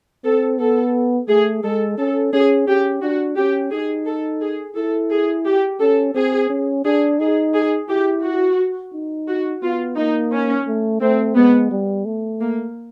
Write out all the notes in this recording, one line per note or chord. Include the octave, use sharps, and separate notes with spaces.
C4 A4
B3 A4
A3 G#4
G#3 A4
C#4 A4
C#4 G#4
C#4 G4
D4 F#4
C#4 G4
D#4 G#4
A4
G#4
E4 A4
G#4
G4
C#4 A4
C4 G#4
C#4
D4 G#4
D#4 G#4
G#4
E4 G4
F#4
D#4
F#4
B3 F4
A#3 D#4
C#4
A3
A3 C4
G#3 B3
G3
A3
A#3